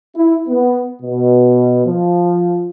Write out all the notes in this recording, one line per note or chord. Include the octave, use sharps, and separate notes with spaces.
E4
B3
B2
F3